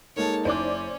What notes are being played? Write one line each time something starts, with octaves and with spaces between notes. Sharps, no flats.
G#3 A#3 D#4 A4 C#5 A5
F#1 C#4 E4 C5 D5 D6